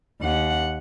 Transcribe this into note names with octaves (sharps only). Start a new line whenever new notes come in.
D#2 F#5